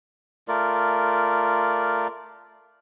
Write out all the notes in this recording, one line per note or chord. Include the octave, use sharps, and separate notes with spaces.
A3 F4 A#4 D5